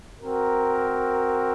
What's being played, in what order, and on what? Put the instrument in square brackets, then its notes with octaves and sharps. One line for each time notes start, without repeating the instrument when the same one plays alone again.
[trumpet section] C4 F#4 A#4